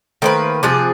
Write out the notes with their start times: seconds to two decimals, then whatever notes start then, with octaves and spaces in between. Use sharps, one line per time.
0.22 D#3 A3 A#3 B4 C5
0.63 C3 F3 G#4 D6 F#6 A6